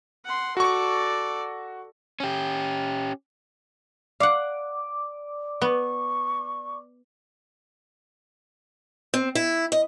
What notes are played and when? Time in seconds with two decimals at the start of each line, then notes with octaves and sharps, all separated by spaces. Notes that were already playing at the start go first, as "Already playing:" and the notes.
0.25 F#5 C6
0.57 F#4 A4 D5 C#6
2.20 C#4 G4
4.20 D5 F5 F#5 D6
5.62 B3 C#6
9.14 C4
9.35 E4
9.72 D#5